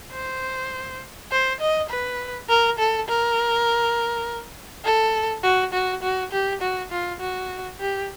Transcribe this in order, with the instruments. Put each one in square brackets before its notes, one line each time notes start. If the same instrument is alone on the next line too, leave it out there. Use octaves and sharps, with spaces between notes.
[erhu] C5
C5
D#5
B4
A#4
A4
A#4
A4
F#4
F#4
F#4
G4
F#4
F4
F#4
G4